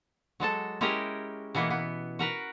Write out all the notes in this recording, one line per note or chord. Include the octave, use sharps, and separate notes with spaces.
F#3 G#3 A4 A5
G#3 C#4 E4 G4 G#4 A#4
B2 E3 A#3 B3
B3
F#4 A#4 B4